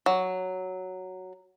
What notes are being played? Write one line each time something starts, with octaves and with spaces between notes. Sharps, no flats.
F#3